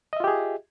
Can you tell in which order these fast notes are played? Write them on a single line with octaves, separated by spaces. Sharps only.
D#5 E5 F4 G4 G#4